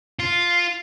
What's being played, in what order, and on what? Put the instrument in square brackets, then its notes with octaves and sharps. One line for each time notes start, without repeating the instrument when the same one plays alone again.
[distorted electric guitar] F4